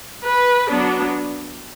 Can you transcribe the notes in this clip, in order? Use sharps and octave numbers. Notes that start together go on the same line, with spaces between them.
B4
F#3 B3 D4